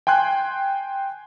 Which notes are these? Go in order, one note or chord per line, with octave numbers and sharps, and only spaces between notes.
G5 G#5 C6 F#6 G#6